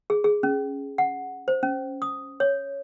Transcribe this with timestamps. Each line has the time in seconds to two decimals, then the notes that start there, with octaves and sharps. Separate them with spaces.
0.10 G#4
0.24 G#4
0.43 C#4
0.98 F#5
1.48 C5
1.63 C#4
2.02 D#6
2.40 C#5